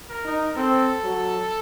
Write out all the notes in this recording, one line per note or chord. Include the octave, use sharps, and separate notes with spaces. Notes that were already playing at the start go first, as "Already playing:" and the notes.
A#4
D#4
C4 A4
F#3